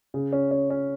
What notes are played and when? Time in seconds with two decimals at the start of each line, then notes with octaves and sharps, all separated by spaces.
0.14 C#3
0.33 C#4
0.51 C#4
0.70 C#4